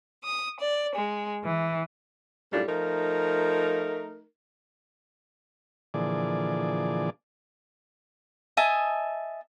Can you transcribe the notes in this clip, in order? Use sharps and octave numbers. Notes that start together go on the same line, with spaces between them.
D#6
D5
G#3
E3
F#2 A2 G3 D4 F4
F3 A3 D#4 A#4
A#2 D3 E3 F3 G#4 D5
D#5 E5 G#5 A5